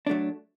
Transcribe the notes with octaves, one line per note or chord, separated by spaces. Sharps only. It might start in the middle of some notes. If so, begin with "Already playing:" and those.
F#3 A3 D4